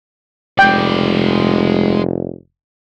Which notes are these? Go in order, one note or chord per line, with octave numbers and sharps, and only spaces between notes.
F1 G#3 D5 G5